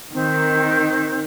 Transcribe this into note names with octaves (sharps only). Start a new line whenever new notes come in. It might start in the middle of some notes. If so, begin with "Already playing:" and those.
D#3 C4